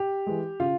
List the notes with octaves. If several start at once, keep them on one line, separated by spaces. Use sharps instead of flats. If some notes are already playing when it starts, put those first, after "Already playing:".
Already playing: G4
E3 G#3
C#3 F4